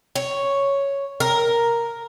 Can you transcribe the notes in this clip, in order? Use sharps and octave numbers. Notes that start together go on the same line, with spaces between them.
C#5
A#4